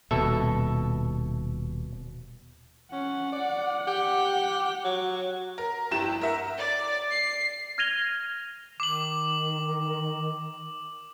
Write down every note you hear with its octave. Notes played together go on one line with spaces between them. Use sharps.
D#1 B2 A4 E5
C#4 F#5
D5
G4
F#3
A#4
G1 E4 G4 E7
A#4 E5 F#5
D5
C7
F6 G#6 A#6 D#7 F7 G7
D#3 D6 F#7